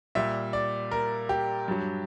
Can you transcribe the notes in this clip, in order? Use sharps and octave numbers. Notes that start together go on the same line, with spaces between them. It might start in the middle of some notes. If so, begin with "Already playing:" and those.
A#2 G3 E5
D5
A#4
G4
G2 F#3